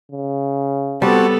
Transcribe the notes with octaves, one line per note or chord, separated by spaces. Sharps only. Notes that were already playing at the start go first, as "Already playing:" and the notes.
C#3
G3 B3 C4 F#4 A4 A5